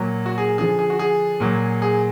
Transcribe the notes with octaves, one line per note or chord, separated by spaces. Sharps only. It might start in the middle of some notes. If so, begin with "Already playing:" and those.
Already playing: A#2 F#3
F#4
G#4
D3 F3 G#4
G#4
F#4
G#4
A#2 F#3
G#4